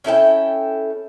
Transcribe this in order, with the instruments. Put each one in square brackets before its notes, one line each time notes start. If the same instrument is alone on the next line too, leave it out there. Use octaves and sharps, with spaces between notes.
[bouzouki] C#4 E4 A4 G5